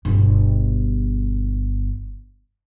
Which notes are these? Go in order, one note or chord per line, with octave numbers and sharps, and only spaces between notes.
G1 B2